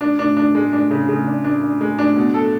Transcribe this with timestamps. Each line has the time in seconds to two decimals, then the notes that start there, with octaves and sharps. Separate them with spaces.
0.01 D4
0.19 D4
0.37 D4
0.55 G#3
0.73 D4
0.91 C#3
1.08 C#3
1.27 D4
1.44 D4
1.62 D4
1.81 G#3
1.99 D4
2.16 B2
2.34 A4